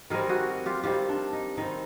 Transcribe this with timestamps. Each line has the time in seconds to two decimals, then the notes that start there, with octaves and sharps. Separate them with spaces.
0.10 D#3 G3 C4 G#4 A#4
0.29 F#4 G#4
0.66 F4 G4
0.83 D#3 G3 C4 F4 G4
1.09 D4
1.33 D#4
1.57 D#3 G3 C4 D#4